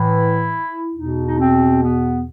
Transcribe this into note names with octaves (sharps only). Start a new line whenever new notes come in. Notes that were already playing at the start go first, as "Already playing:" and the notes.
Already playing: A2 E3 E4
E2 B2 D#4
D#4
C4
B3